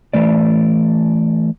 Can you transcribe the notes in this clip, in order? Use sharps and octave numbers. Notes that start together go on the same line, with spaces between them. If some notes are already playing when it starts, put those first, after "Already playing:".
E3 A3 D5